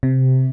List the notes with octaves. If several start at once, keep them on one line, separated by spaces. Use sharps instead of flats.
C3